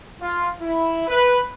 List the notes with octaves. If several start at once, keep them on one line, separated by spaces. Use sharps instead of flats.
F4
E4
B4